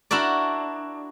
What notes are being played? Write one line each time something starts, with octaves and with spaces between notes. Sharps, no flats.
D4 E4 F#4 A#4 D5